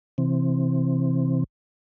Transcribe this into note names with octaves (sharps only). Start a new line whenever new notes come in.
C3 E3 C4